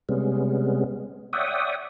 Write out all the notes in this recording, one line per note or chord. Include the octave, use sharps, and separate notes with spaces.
C3 G3 G#3 B3 C#4
C#5 D5 E5 F#5 G5 D#6